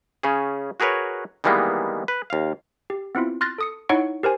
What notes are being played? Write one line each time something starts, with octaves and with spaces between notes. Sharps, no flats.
C#3 C#4 G#4
F#4 G#4 A#4 B4 C#5
D#3 E3 G3 G#3 A#3 B3
B4
D#2 F5
G4
B3 C4 E4 F4
C6 F6 F#6 A6 A#6
A4 D#6 C#7
D#4 E4 C#5 F#5 C#6 D7
G4 A#4 C5 G#5